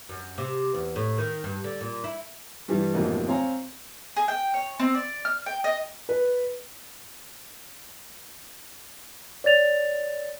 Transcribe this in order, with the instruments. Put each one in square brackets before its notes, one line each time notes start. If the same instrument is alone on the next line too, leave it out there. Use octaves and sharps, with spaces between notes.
[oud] F#2
C3
E2
A2
D#3
G2
D3
A#2
E4
[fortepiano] G2 E3 G3
A1 F2 G#2 B2 A#3 D#5
C4 C#5 F5 G#5 A#5
[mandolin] G#4
G5
C#5
C4
D5
F6
G5
D#5
[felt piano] B4
[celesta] C#5 D5 A6 F7